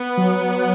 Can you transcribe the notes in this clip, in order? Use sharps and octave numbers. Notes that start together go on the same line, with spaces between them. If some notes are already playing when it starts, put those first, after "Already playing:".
Already playing: B3
F#3